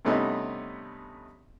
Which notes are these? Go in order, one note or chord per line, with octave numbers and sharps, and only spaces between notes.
G2 C3 A3 B3 C#4 D#4